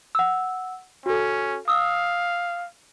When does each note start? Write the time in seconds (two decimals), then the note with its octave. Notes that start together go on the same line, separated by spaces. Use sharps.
0.15 F#5 E6
1.06 C#4 F#4 A4
1.68 F5 D#6 E6